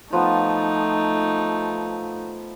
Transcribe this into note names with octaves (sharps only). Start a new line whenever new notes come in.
F3 A3 B3 D#4